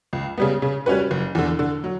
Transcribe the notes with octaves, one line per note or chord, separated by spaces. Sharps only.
C#2
C#3 G3 B3
C#3
G3 C#4 F#4 B4
F#1
E2 D3
D3
F#3